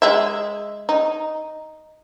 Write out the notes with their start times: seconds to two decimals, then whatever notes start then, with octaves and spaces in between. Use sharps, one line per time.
0.02 G#3 E5
0.89 D#4